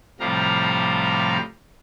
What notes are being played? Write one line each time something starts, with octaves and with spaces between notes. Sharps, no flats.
A2 C3 F3 G3 F5 A#5